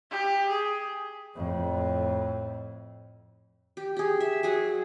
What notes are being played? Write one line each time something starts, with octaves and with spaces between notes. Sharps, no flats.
G4
G#4
F2 A2
G4
G4 G#4
E5
F#3 G#4 F#5